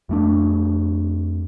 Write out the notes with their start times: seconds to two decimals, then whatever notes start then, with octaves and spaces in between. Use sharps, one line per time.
0.09 F2 A3 D4